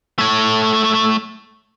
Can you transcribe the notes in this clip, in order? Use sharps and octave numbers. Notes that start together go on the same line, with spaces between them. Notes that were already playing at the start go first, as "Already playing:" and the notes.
A3 C#5